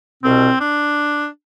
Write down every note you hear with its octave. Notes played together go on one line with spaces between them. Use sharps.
C2 B2 C4
D4